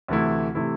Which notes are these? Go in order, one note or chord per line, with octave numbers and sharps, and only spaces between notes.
D2 C3 E3 A3 E4
C3 E3 A3 E4